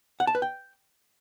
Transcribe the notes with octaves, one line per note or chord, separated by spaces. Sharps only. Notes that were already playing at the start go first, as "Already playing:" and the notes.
F#5
A5
B4
G5